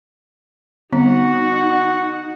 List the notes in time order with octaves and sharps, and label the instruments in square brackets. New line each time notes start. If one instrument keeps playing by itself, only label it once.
[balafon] D3 G3 C4 [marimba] B3 [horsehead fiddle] D#4 F#5 [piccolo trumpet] F#4